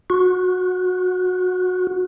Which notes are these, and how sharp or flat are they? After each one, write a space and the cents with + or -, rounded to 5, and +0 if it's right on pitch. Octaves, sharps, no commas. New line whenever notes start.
F#4 -20